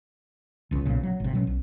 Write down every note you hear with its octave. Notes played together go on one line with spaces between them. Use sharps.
E1 C#2
B1 A#2 C#3
F#3
G#1 C3
B2 F#3 C#4
B1